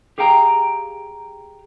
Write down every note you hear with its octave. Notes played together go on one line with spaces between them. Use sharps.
G4 G#4 F5 G5 A#5